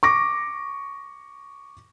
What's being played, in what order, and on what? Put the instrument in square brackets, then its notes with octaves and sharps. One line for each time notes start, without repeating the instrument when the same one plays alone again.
[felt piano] C#6 D6 A#6